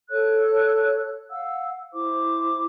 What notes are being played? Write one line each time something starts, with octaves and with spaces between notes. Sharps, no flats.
A4 C#5 F#6
F5 F#5 E6
E4 C5 D6